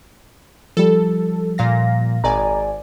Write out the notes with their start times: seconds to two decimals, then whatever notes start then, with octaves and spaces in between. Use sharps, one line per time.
0.77 F3 G3 A4
1.58 A#2 F5 A#6
2.24 G#1 D5 G#5 A#5